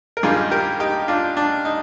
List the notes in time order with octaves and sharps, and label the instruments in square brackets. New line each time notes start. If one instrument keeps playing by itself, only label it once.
[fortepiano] A#4
G2 D#3 G3 F4 G#4
G4 A#4
D#4 G4
D4 F4
D4
D#4